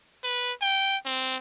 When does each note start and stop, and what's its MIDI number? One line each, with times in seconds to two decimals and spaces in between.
0.24 0.52 71
0.62 0.97 79
1.06 1.36 60